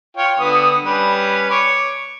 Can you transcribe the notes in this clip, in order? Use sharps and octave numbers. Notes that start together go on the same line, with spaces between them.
F4 C#5 G5
D3 B3 D#6
G3 C#4 B4
C#5 D6